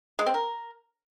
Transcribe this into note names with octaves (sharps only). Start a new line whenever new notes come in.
G#3
C4
A#4